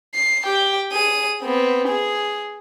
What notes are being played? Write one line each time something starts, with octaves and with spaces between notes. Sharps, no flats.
C7
G4 G5
G#4 D#7
B3 C4
G#4